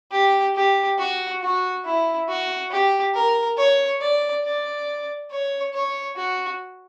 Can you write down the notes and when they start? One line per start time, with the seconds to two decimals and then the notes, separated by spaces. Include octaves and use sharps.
0.12 G4
0.56 G4
0.99 F#4
1.42 F#4
1.85 E4
2.29 F#4
2.71 G4
3.14 A#4
3.58 C#5
4.01 D5
4.44 D5
5.31 C#5
5.74 C#5
6.17 F#4